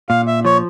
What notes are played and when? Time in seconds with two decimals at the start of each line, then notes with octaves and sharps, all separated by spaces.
0.09 A#2 F5
0.27 E5
0.45 F3 C#5